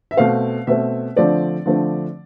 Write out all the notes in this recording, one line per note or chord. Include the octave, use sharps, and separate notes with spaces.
E5
B2 A3 C4 F5
B2 A3 C4 E5
D3 F3 A3 C4 D5
D3 F3 A3 C4